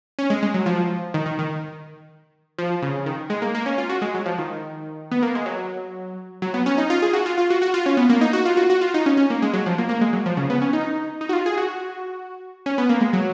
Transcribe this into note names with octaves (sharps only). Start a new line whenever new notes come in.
C#4
G#3
G#3
F#3
F3
D#3
D#3
D#3
F3
C#3
D#3
G#3
A#3
A#3
C#4
F4
F#4
G#3
F#3
F3
D#3
B3
A#3
G#3
F#3
F#3
B3
C#4
D#4
F4
G#4
F#4
F4
F4
F#4
F#4
F4
C#4
B3
A#3
D#4
F#4
F4
F#4
F#4
F4
D#4
C#4
C#4
A#3
G#3
F#3
F3
A#3
A#3
G#3
F#3
F3
C#3
B3
C#4
D#4
D#4
F#4
F4
G#4
F#4
C#4
B3
A#3
G#3
F#3